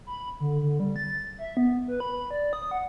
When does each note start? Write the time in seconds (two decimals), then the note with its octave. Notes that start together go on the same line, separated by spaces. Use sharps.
0.07 B5
0.40 D3
0.62 D3
0.80 G3
0.96 A6
1.39 E5
1.57 B3
1.88 B4
2.00 B5
2.31 D5
2.53 D#6
2.71 F#5